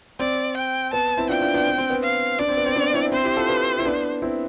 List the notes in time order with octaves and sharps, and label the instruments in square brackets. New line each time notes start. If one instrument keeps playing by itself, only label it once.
[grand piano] C4 [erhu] D5
[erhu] G5
[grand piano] B3 [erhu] A5
[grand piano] C4 E4
[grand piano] D4 F4 [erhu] G5
[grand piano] D4 F4
B3 D4
C4
C4
B3
[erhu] F5
[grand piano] D4 [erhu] D5
[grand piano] C4
B3
C4
B3 D4
C4 E4
[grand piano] C4 E4 [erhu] C5
[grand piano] E4 G4
F4 A4
G4 B4
E4
B3 D4
C4 E4